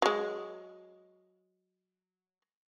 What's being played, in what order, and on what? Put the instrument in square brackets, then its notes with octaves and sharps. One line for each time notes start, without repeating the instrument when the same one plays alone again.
[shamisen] F#3 G#3